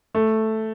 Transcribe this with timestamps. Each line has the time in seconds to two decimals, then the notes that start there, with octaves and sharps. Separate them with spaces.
0.15 A3